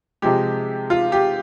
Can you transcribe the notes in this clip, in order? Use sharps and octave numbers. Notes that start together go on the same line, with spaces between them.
C3 F3 G#3 G4
F4
G4